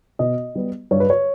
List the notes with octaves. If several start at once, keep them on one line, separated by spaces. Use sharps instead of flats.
B2 D#5
G3 B3
G2 C#5
B4
C#5